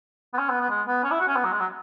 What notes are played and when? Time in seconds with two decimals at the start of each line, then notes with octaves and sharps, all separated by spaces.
0.34 B3
0.39 C#4
0.50 B3
0.61 B3
0.70 G#3
0.87 B3
1.04 C#4
1.11 E4
1.20 F#4
1.28 C#4
1.36 B3
1.44 F#3
1.52 G#3
1.60 F#3